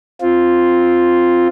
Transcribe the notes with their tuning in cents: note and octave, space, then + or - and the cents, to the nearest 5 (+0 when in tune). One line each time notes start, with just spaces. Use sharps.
C4 +0 F4 +0